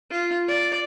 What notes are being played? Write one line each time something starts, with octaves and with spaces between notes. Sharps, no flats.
F4
D5